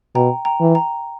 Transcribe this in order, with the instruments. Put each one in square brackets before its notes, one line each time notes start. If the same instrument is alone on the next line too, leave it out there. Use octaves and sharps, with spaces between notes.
[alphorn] B2 [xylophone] G5 A#5
[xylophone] G5 A#5
[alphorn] E3
[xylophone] G5 A#5